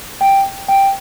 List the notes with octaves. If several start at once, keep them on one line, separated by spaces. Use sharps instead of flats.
G5
G5